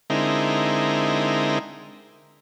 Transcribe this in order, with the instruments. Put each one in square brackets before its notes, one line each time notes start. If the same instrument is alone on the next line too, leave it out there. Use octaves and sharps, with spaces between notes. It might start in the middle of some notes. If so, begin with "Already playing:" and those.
[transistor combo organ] D3 G#3 C4 D#4 E4 A#4